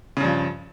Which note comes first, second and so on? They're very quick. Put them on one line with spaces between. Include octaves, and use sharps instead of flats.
C#3 G2 F3